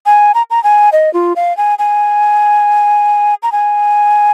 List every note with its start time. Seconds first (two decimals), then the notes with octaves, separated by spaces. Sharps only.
0.06 G#5
0.35 A#5
0.50 A#5
0.64 G#5
0.92 D#5
1.14 F4
1.36 F5
1.57 G#5
1.79 G#5
3.43 A#5
3.52 G#5